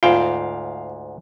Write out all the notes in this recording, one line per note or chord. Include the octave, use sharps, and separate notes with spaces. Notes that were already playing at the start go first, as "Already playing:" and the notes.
D2 G#2 F4 F5 G5